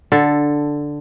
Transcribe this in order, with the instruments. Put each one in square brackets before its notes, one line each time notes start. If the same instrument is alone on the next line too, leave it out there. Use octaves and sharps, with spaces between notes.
[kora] D3 A4